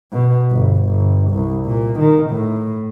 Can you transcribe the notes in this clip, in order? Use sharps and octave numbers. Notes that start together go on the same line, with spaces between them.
B2
G1
G1
C2
A#2
D#3
A2